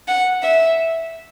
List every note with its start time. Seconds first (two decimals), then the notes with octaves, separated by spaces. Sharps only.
0.08 F#5
0.43 E5